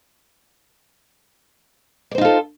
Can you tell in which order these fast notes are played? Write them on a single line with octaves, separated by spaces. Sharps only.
D5 C5 D#4 F4 A4